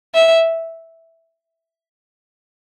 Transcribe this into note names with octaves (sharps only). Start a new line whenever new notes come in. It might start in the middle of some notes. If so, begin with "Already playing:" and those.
E5